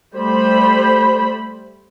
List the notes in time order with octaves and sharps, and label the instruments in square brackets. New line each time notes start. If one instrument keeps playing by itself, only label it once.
[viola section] G3 A3 C5 B5